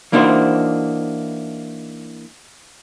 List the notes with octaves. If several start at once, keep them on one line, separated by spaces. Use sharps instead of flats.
E3 A#3 D4 D#4 F#4 C5